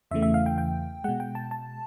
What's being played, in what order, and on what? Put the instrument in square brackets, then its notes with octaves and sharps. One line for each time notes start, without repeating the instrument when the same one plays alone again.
[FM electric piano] E2 C#3 E3 A3 E5
E5
F5
G5
G5
B2 G#3 F#5
G5
A5
A5